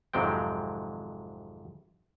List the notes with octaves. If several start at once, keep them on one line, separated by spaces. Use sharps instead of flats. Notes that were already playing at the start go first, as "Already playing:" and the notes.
G#1 F2 C3 F#3 G#3 G5